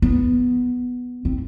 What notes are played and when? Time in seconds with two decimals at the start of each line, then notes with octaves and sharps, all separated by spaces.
0.02 B3
1.25 C4